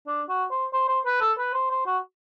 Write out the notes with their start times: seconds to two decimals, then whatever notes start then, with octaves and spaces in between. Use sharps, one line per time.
0.07 D4
0.29 F#4
0.51 C5
0.73 C5
0.88 C5
1.05 B4
1.21 A4
1.38 B4
1.54 C5
1.70 C5
1.86 F#4